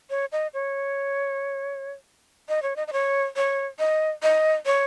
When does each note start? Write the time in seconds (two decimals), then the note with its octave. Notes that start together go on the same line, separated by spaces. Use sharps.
0.10 C#5
0.32 D#5
0.54 C#5
2.49 D#5
2.63 C#5
2.76 D#5
2.88 D#5
2.93 C#5
3.36 C#5
3.79 D#5
4.23 D#5
4.66 C#5